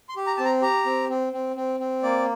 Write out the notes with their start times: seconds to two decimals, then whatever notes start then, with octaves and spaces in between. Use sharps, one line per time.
0.09 C6
0.16 G4
0.27 A#5
0.37 C4 A5
0.45 A#5
0.62 G4 A#5
0.86 C4
1.10 C4
1.33 C4
1.56 C4
1.80 C4
2.03 A#3 D5